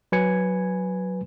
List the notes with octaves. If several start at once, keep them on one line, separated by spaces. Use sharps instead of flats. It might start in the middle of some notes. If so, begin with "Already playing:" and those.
F#3 B4 G#5 G#6 C#7